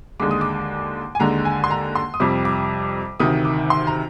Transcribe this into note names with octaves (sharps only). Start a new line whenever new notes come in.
D#2 D3 G#3 D6
D#6
D6
G#5
D#2 D3 G#3 A#5
G#5
C6
A#5
C6
D#6
F2 C3 G3 D6
D6
D2 C3 D#3 D#6
D6
C6
A#5